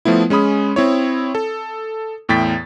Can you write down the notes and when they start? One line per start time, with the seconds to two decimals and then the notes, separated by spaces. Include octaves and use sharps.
0.05 F3 A3 B3 E4
0.30 G#3 C#4 G#4 B5 D#6
0.76 C4 E4 C#5
1.35 A4
2.29 E2 A2 G5 A6 B6